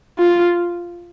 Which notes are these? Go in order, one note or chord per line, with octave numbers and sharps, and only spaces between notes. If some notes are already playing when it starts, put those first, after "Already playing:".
F4